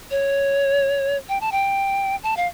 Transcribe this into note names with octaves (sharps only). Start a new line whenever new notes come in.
C#5
G5
A5
G5
A5
F5